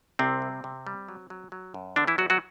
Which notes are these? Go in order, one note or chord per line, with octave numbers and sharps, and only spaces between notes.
C2 C3 C4
G3
C3
G3
F#3
F#3
F#3
F#2
E2 D3 D4
E3 E4
E2 F#3 F#4
F#3 F#4